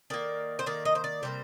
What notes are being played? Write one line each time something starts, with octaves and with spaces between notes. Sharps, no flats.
D#3 A#3 D5
C5
D#3 A#3 D5
D#5
C5
D5
C3 G3 A#3 C5